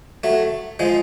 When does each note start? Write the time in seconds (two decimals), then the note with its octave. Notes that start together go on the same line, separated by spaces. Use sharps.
0.24 F#3 A3
0.79 F3 G#3